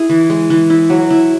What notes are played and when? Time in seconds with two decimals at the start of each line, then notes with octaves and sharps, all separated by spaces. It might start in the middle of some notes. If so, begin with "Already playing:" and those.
Already playing: E4 G#4
0.10 E3
0.30 G#3
0.50 E3
0.70 E4
0.90 F#3
1.11 E4